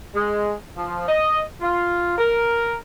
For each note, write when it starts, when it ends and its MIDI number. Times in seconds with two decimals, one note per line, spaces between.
0.14 0.54 56
0.76 1.05 53
1.07 1.41 75
1.61 2.17 65
2.18 2.76 70